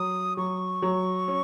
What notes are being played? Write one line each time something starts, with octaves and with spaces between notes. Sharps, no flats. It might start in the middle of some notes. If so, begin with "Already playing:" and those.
Already playing: F#3 D#6
F#3 C#6
F#3
C#4